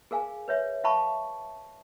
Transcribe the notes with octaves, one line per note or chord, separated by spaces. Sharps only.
G#4 A#4 F5 G#5
B4 C#5 E5
E5 F5 A5 B5 C#6